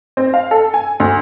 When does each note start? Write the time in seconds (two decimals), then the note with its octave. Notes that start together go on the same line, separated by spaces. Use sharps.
0.17 C4
0.34 F5
0.51 A4
0.74 G#5
1.00 D2